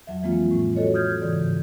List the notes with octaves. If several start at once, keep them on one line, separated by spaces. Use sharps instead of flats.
F2 F#3 E5
E3 F3 G#3 A#3 C4 F4
A2
F#4 A4 C#5 D#5
D#6 F6 G6 G#6
G#2 C#3 E3 D5